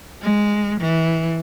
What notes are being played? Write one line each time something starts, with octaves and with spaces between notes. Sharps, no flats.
G#3
E3